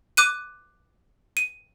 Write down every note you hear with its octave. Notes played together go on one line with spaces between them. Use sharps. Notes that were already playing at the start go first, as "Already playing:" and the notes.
D6 F#6 D#7
D#7